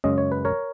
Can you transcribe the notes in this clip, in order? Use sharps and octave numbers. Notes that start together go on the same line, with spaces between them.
F#2 C#3 G#3 C#4 D#5
C#5
B4
A#4 C#5